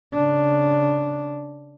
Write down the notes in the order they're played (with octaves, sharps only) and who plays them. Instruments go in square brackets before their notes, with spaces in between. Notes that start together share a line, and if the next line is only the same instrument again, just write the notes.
[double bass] C#3 D4